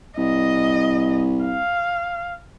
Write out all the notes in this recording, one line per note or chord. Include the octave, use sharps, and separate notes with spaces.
C2 D#5
F5